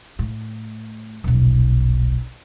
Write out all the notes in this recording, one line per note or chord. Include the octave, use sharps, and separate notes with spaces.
A2
D#1 B1